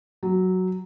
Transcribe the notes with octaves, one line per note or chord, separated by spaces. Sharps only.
F#3